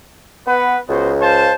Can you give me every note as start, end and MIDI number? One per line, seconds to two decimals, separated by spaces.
0.47 0.77 59
0.47 0.80 71
0.47 0.80 78
0.89 1.55 37
0.89 1.11 59
0.89 1.11 66
0.89 1.11 72
1.21 1.55 72
1.21 1.55 77
1.21 1.55 81